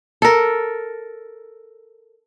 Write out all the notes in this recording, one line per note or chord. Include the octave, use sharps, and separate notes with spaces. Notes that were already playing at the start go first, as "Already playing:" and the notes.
A4 A#4